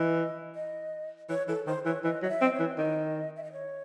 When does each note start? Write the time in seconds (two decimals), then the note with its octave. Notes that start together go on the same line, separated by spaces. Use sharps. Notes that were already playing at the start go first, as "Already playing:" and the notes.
Already playing: E3 D#5
0.55 D#5
1.29 E3 C#5
1.48 E3 A4
1.67 D#3 C5
1.86 E3 C#5
2.04 E3 D#5
2.22 F#3 D#5
2.29 E5
2.41 C4
2.45 D#5
2.54 C#5
2.60 E3
2.78 D#3 D#5
3.36 E5
3.44 D#5
3.52 C#5